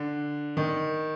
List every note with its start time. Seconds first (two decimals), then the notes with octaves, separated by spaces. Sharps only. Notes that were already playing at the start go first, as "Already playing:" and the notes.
Already playing: D3
0.57 D#3